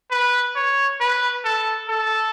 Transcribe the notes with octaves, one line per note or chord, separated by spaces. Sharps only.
B4
C#5
B4
A4
A4